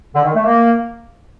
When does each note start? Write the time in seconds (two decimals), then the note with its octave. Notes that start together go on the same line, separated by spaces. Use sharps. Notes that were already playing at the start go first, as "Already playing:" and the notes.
0.15 D3
0.24 D#3
0.35 A3
0.45 A#3